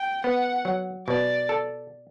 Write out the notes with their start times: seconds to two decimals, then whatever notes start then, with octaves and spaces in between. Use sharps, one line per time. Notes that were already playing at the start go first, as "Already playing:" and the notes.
Already playing: G5
0.24 B3 F#5
0.65 F#3
1.07 B2 D5
1.49 A4